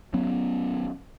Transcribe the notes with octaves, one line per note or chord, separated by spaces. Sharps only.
F#3 B3 C#4